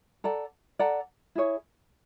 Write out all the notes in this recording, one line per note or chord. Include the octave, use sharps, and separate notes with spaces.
A4 D5 F#5 A#5
A4 D5 F#5 A#5
E4 G#4 C#5